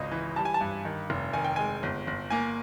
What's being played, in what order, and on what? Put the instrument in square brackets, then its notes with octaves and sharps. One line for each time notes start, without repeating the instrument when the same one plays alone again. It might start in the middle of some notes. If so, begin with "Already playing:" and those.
Already playing: [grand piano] G#1 C#2 D#5
E3
G3 A5
G#5
A5
G2
D#3
F1
D#3 G#5
G5
G#3 G#5
G1
G1
A#3 G#5